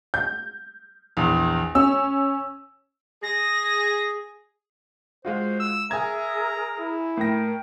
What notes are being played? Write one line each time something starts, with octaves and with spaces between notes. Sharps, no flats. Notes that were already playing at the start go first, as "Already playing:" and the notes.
G6
A#1 E2
C#4 E6
G#4 A#6
G#3 F4 F#4 C5
E6
G#4 A#4 E5 G#5 A#5 D#6 G#6
E4
A2 A#4 G5 A#6